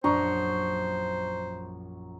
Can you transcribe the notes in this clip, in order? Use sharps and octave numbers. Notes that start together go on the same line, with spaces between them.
A#1 F#2 D4 C5 A#5 C#6 D#6